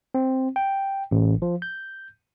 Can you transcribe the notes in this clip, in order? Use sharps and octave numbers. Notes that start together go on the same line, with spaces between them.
C4
G5
A1
F3
G6